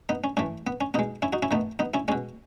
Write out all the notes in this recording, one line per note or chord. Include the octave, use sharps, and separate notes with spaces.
B3 D#4
C#4
A2 E3 A3 C#4
B3
C#4
B2 G#3 B3 D#4
C#4 E4
D#4 F#4
C#4 E4
D#3 A3 B3 D#4
B3 D#4
C#4 E4
B2 G#3 C#4